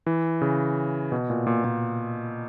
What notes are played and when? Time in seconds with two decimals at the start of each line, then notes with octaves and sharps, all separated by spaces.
0.06 E3
0.41 C#3
1.12 B2
1.30 A#2
1.47 A#2
1.64 A#2